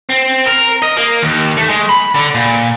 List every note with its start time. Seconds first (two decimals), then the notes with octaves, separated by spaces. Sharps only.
0.10 C4
0.47 A#4
0.83 D#5
0.97 A#3
1.23 D#2
1.57 A3
1.69 G#3
1.89 B5
2.15 D3
2.35 A#2